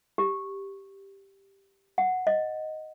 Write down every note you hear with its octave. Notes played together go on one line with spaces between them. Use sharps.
G4
F#5
D#5